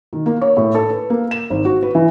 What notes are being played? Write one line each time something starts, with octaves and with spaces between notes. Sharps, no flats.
D#3
A#3
C#5
A2
A4
B4
A#3
E7
G#1
F#4
B4
E3